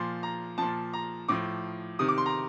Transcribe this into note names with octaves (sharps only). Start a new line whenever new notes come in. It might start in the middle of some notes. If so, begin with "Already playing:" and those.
Already playing: A#2 F3 C6
A#5
A#2 F3 A5
A#5
A2 F3 D6
C3 D#3 D#6
D6
C6
A#5